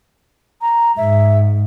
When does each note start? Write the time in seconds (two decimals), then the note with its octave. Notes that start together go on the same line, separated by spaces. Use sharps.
0.61 A#5
0.97 G#2 E5